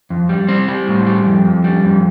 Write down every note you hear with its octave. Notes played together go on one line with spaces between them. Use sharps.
F2
G3
G3 C4
G3
A2
G3
F2
F2
G3
F2